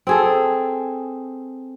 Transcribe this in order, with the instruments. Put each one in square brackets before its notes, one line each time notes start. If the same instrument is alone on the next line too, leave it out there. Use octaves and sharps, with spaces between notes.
[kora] C4 G#4 A4